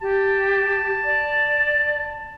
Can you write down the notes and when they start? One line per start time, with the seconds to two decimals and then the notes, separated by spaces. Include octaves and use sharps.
0.01 G4 A5
1.05 D5